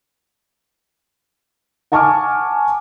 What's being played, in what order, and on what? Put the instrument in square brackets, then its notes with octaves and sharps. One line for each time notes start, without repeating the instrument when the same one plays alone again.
[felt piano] F#5 G#5 A5 C#6 D6 F6